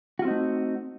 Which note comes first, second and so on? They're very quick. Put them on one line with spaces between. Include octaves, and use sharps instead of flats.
F#4 F4 C4 D#4 A3